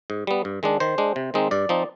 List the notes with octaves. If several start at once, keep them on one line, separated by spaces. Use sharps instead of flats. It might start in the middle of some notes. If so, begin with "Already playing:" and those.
G#2
G3 B3
G2
D#3 G#3 D4
D#3 C5
G#3 D4
C3
D#3 G#3 C4 D#4
G2 D5
F3 C4 D#4